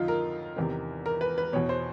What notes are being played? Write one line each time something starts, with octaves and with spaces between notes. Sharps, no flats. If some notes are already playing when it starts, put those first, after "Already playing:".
Already playing: F2 D3 F3 D#4 F4
A#4
E2 C3 D#3
A#4
B4
B4
E2 B2 C#5
C5